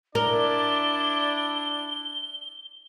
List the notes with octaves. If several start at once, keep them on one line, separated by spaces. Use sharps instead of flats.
D4 E4 A#4 D5 G7